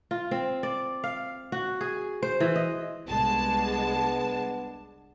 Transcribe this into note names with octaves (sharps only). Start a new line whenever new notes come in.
F4
C4
D5
F5
F#4
G#4
C5
E3
D#5
C2 G#3 B3 D4 A5